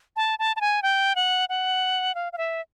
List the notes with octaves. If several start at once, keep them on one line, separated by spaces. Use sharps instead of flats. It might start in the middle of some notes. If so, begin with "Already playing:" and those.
A5
A5
A5
G#5
G5
F#5
F#5
F5
F5
E5